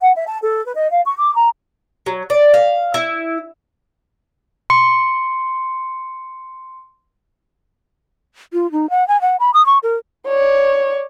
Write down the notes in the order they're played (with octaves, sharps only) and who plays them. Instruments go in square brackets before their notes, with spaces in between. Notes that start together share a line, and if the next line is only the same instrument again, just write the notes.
[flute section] F#5
E5
A5
A4
B4
D#5
F5
C#6
D6
A#5
[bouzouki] F#3
D5
F5
E4
[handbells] C6 C#7
[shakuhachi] F4
D#4
F#5
G#5
F#5
B5
D#6
C#6
A#4
[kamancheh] C#5 D5